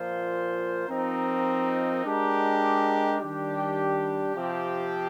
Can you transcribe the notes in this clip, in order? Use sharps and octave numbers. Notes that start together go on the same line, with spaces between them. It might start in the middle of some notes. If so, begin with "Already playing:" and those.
Already playing: A#2 F3 A#3 F4 C5
F3 C4 D#4 A#4
G#3 D4 G4 A#4
D#3 G3 D4 G4
C3 F3 C4 G4